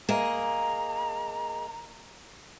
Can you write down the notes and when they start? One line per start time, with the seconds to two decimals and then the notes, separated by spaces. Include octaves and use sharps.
0.09 A#3 G#4 D#5 A#5